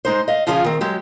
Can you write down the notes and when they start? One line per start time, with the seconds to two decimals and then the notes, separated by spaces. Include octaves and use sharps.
0.05 G#3 D#4 C5
0.28 D#5 F5
0.47 C#3 F3 F4 G#4 F5 G#5
0.64 D#3 C4
0.81 F#3 G#3 G4